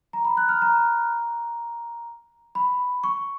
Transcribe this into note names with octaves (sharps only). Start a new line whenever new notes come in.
A#5
B5
F#6
F6
A#5
B5
C#6